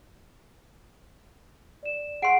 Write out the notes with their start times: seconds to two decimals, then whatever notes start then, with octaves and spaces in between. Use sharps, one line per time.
1.83 D5 E7
2.22 G#4 F#5 C6 C7 D7